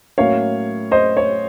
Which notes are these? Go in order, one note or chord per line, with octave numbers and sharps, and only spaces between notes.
A2 F#3 A#3 C#4 C#5 F5
C5 D#5
C#5